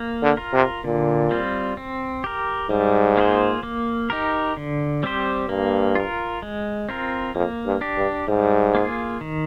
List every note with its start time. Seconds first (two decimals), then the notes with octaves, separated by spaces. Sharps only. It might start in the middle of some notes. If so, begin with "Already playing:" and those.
Already playing: A#3
0.22 D3
0.37 F4 A#4
0.53 C3
0.84 A#2 D3
1.31 G3 C4 F4
1.77 C4
2.24 G4 A#4
2.70 G#2 G3
3.17 A#3 F4 G#4 C5
3.63 A#3
4.10 D#4 G4 A#4
4.57 D3
5.03 G3 C4 G4 C5
5.49 G2 A#3
5.95 F4 A#4
6.42 G#3
6.89 C4 F4 A#4
7.35 F2 A#3
7.66 G2
7.81 D4 G4
7.97 G2
8.28 G#2 G3
8.75 A#3 F4 G#4
9.21 D#3